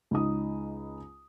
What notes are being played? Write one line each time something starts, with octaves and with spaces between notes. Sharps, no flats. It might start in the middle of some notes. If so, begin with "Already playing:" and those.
C#2 D#4 D#6